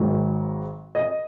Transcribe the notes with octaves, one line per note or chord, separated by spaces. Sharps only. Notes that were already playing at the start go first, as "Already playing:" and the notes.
Already playing: G#1 G#2 D#3 F#3
D#5